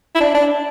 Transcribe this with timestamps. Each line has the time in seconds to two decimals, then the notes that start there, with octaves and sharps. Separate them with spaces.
0.15 E4
0.20 D4
0.34 D4